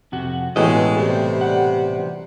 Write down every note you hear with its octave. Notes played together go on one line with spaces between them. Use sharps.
F2 C3 F#4
A1 B2 G#3 E4 F#4 D#5
C3 G3 A3
F#5